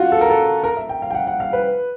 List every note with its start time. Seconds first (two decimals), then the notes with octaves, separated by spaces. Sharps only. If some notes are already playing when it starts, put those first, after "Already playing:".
Already playing: F4 F#4
0.12 A4
0.21 A#4
0.30 A4
0.64 A#4
0.77 E5
0.89 G5
1.02 F5
1.11 G5
1.15 F#5
1.27 F#5
1.40 F5
1.53 B4